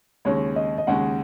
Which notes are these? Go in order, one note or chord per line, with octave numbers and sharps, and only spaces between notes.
D#2 C#3 G#3 C#5
D#5
D#5
D#2 C#3 G#3 F#5